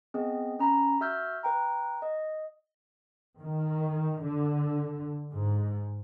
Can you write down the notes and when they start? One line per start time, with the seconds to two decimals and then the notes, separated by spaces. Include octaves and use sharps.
0.14 B3 C4 G#4 D#5
0.59 C#4 A#5 B5 A#6
1.01 F#4 E5 E6 F6 G6
1.43 B4 G5 A#5
2.02 D#5
3.41 D#3
4.22 D3
5.33 G#2